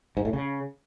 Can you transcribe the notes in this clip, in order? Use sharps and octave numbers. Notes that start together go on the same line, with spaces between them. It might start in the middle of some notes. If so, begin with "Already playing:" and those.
G#2
A2
C#3